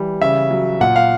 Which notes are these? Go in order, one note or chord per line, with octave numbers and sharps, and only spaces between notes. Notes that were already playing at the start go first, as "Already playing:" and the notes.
Already playing: E3 G3
C#3 E5
F#3
A#2 F#5
F5